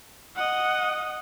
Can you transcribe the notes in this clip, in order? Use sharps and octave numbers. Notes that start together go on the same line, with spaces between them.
D#5 F#5